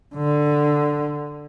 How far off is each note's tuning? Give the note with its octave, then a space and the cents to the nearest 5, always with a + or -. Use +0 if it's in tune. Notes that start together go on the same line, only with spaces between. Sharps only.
D3 +5